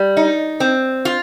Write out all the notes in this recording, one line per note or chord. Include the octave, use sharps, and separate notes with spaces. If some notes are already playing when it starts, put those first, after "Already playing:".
Already playing: G3
D#4
C4
F4